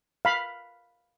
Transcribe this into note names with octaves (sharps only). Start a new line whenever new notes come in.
F5 B5